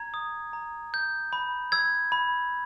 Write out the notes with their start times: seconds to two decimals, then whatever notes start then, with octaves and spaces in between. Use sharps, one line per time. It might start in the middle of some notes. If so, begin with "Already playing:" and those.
Already playing: A#5 G#6
0.14 D#6
0.53 A#5
0.94 G6
1.33 B5
1.72 E6 G#6
2.12 B5